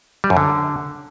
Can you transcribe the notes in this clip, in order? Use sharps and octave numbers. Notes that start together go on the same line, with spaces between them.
G3
F#2
D3